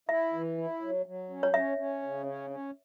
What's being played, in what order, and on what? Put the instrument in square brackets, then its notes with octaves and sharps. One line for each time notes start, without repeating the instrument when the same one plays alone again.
[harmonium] E4 [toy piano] E5
[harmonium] E3
E4
F#3
F#3
C#4
[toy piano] C#5
[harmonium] C#4 [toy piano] E5
[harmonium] C#4
C#3
C#4
C#4